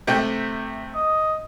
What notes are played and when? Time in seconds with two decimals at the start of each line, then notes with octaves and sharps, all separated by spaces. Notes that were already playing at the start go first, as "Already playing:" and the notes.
0.07 C3 A3 G5
0.95 D#5